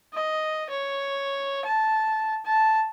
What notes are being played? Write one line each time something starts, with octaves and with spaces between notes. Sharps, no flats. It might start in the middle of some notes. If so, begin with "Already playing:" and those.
D#5
C#5
A5
A5